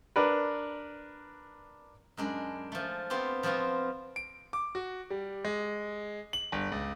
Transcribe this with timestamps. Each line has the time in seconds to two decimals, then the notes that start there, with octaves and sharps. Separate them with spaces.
0.16 D4 A#4 B4
2.17 F#2 G#3 D4 B5
2.72 F3 A3
3.10 B3 C4 F4 G4
3.43 F3 B3 C4 F4 F#4
4.16 D7
4.53 D6
4.75 F#4
5.10 G3
5.45 G#3
6.33 F#7
6.52 G1
6.72 C#2